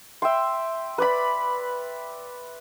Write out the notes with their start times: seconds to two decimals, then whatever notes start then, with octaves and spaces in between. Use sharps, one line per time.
0.22 E5 G5 C6
0.98 B4 D5 B5